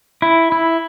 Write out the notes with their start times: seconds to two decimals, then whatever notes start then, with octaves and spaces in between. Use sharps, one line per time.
0.22 E4
0.52 E4